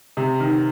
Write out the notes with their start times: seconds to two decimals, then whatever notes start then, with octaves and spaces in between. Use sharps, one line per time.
0.17 C3
0.40 D#3